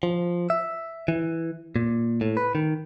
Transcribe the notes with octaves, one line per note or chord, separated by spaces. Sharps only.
F3
E5
E3
A#2
A2
B4
D#3